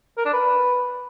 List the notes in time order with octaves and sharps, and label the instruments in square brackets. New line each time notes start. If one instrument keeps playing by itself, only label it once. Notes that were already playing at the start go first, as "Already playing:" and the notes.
[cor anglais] A#4
D4
B4